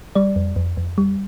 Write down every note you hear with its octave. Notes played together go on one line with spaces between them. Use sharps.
G3 D5
F2
F2
F2
G3